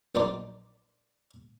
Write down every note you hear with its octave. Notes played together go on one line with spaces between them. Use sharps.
A#1 F#2 D4 D#4 C5 D5